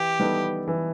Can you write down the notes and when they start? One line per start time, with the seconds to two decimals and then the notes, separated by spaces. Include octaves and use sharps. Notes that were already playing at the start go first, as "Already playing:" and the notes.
Already playing: E3 G4
0.19 G3 B3 D#4 A4
0.68 E3